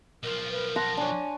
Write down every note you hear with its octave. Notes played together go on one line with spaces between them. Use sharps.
B1 F3 A#4
B4
F#5 A5 C6 A#6
D4 C#5 G#5